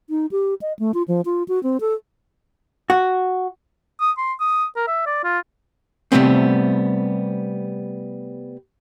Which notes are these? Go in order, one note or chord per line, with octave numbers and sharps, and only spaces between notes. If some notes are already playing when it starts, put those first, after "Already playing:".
D#4
G4
D#5
A3
F4
F3
F4
F#4
C4
A4
F#4
D#6
C6
D#6
A#4
E5
D5
F4
C3 G3 A3 B3 C4